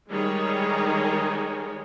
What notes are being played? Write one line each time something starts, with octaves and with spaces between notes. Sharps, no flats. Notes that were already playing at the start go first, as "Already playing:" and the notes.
D#3 G3 G#3 D#4 G#4 C#5